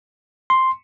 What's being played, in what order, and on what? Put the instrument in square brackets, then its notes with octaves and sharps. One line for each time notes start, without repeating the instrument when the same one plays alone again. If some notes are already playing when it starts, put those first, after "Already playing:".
[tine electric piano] C6